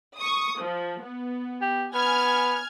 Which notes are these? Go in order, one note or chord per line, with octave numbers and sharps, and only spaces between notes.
C#6 D#6
F3
B3
G4
B3 G#5 F6 G#6